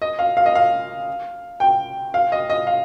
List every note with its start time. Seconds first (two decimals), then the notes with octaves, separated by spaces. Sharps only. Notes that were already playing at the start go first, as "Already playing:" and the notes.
0.02 D#5
0.19 F5
0.37 F5
0.46 D#5
0.55 F5
1.60 G5
2.14 F5
2.32 D#5
2.50 D#5
2.67 F5